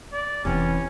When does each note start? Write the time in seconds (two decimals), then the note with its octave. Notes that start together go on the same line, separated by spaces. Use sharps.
0.13 D5
0.45 E1 C3 E3 B3 C#4